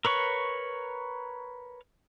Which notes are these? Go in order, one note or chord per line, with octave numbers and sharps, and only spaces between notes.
A#4 B4 C#5 C#6